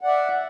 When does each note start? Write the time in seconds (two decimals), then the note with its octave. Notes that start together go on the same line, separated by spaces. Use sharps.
0.01 F#5
0.04 D5
0.07 E5